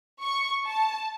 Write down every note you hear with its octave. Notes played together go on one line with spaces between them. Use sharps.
C#6
A5